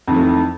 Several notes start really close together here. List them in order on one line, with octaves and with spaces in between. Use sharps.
F2 D#3 E3 A3